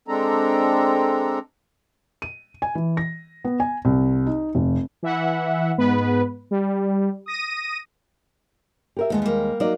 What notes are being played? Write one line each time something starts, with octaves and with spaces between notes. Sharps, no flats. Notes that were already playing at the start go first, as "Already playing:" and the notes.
G#3 C4 D4 A4 A#5
D#7
G#5
E3
A#6
B3
G#5
C2
D#4
F1
E3 E5 F#5
G#2 B3 B4
G3
D#6 A#6 D#7
G4 A#4 E5
D#2 G#3 B3 D#4 A4
G3 A#3
F#3 A#3 D#4 D5